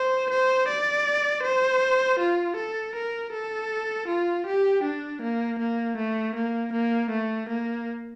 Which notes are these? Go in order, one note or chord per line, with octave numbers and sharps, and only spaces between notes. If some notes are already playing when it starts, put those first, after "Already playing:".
Already playing: C5
C5
D5
C5
F4
A4
A#4
A4
F4
G4
D4
A#3
A#3
A3
A#3
A#3
A3
A#3